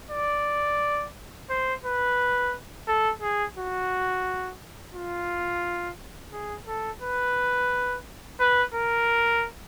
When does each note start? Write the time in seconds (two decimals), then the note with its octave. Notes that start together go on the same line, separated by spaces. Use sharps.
0.11 D5
1.50 C5
1.84 B4
2.88 A4
3.22 G#4
3.57 F#4
4.94 F4
6.32 G#4
6.67 A4
7.02 B4
8.40 B4
8.74 A#4